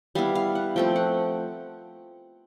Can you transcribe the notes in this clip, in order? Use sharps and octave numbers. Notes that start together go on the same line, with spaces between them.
G3 B3 E4 F5
F5
F#5
F3 A3 C4 G5
F#5